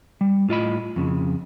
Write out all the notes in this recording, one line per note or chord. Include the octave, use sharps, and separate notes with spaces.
G3
A2 F4 D#5 B5
F2 C#3